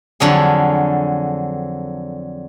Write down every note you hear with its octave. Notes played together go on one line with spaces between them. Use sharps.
F2 D3 F#3 G#4